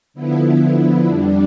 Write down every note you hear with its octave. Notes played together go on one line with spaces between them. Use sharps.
D3 F3 B3 E4
F2 D3 G3 D4